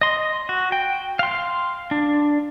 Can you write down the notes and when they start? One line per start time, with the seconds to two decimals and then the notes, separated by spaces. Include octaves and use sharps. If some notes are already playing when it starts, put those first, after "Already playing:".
0.01 D#5 C6
0.49 F#4
0.72 G5
1.19 F5 C6
1.91 D4